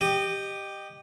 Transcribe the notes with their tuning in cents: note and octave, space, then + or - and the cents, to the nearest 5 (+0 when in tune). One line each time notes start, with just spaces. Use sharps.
G4 +0 D#5 -20